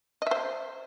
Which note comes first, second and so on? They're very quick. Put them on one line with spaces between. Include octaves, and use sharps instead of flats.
D#5 E5 C5